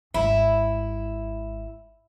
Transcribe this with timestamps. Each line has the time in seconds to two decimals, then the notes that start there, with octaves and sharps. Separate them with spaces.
0.14 G#1 E4